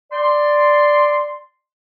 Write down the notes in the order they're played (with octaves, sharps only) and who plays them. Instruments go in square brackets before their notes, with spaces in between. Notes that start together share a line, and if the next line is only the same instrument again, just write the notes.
[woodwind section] D5 C6